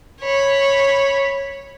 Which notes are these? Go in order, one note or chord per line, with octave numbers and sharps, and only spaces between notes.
C#5 B5